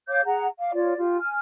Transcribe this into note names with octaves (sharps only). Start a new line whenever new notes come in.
C#5 F5 D6 G6
G#4 F#5 A#5
F5 D6
F4 C#5 D5
F4 G4
G#5 F6